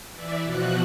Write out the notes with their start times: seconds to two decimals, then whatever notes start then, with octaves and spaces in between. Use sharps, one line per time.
0.12 E3 D5 E5
0.43 B2 F3 F#4 F#6